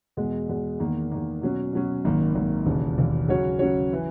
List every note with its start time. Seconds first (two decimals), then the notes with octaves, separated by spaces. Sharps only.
0.17 E2 B2 G#3
0.49 E2 B2 G#3
0.80 E2 D#3 A#3
1.11 E2 D#3 A#3
1.42 B2 F#3 C#4
1.73 B2 F#3 C#4
2.05 G#1 F#2 D#3 A#3
2.35 G#1 F#2 D#3 A#3
2.66 E1 D#2 C#3
2.98 E1 D#2 C#3
3.28 C#3 F#3 C#4 F#4 C#5
3.59 C#3 F#3 C#4 F#4 C#5
3.93 E3